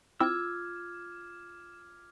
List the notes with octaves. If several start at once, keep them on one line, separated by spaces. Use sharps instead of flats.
C4 E4 F4 D6 E6 F6 G#6